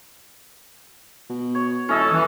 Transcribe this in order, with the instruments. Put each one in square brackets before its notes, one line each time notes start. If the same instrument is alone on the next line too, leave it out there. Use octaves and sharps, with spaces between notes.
[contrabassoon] B2
[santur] C#5
[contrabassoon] D#1 [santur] C#4 D#5 [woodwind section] E4 A4
[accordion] E3